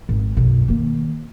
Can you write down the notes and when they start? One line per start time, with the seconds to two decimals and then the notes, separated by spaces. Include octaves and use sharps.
0.09 G#1
0.37 B1 F#2
0.68 D#3 A#3